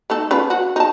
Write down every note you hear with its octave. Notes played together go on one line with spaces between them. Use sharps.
A3 D#4 A4
C#4 F4 B4
F#4
D#4 A5